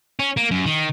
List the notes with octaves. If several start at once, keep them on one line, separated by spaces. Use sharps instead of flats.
C#4
A#3
F#2
D#3